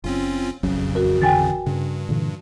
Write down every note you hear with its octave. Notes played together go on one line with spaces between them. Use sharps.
F#1 C4 C#4 F4
E1 A1 F2 C#3 F#3 C#4
F#4 A#4
D3 E3 G5 G#5 A6
G2 C#3
A#2 D3 E3